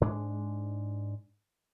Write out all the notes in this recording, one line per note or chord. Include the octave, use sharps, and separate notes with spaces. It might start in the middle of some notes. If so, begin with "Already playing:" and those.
G#2 G#3 D4